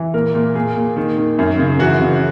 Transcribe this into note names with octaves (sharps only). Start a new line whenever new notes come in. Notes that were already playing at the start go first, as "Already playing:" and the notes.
Already playing: E3
A#2 A#4
A#2
A#2 G#4
A#2
D#3
D#3
F#2
C#3
E3 F#4
C#3